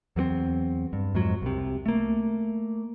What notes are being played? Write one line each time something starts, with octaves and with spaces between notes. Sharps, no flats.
E2 F#3 A3 C4
G2
F2 G#2 F#3
C2 C3
A3 A#3